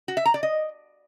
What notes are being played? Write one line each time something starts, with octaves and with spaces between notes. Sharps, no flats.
F#4
E5
A#5
D5
D#5